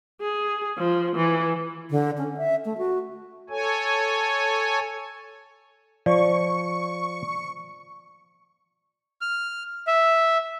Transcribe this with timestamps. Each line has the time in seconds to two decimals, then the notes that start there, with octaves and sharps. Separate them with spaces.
0.21 G#4
0.78 F3
1.16 E3
1.91 D3
2.18 C#4
2.37 E5
2.65 A3
2.78 F#4
3.50 A4 C#5 G#5
6.06 F3 D5 C#6
9.21 F6
9.87 E5